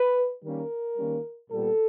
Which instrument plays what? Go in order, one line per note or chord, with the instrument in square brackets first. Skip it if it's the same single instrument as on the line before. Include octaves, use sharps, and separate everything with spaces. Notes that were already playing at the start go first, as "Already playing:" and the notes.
Already playing: [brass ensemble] B4
D#3 G3 A#3 C#4 A#4
D#3 G3 A#3 C#4
A#2 G3 B3 A4